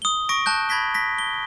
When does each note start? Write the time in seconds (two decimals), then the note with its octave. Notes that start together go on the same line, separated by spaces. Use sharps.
0.02 D#6 G7
0.29 C#6 A#6 D7
0.46 A5 F#6 G6
0.69 B5 G#6 A#6 B6 G7
0.94 A#6 B6
1.18 G7